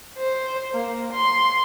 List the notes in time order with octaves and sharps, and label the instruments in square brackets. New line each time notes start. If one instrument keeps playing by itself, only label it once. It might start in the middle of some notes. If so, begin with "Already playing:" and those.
[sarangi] C5
A#3
C6